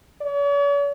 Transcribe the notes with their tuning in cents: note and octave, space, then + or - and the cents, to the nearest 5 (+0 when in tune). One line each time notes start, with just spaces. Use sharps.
C#5 +45